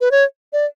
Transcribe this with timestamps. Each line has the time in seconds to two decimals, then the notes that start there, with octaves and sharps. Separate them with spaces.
0.01 B4
0.11 C#5
0.53 D5